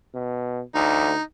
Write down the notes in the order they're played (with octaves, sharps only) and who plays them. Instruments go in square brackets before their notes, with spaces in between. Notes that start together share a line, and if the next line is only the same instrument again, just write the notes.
[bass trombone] B2
[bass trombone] D2 [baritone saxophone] D#4